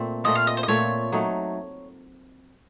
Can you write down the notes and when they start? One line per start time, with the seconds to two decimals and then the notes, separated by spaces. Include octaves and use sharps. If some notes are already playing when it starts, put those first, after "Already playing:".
Already playing: A#2 A3 C4
0.24 A#2 A3 C4 F4 D#5
0.35 F5
0.47 D#5
0.57 C5
0.63 D#5
0.68 A#2 A3 C4 F4 C#5
1.12 F#3 A3 D#4